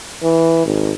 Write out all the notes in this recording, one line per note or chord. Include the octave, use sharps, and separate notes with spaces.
E3
G#1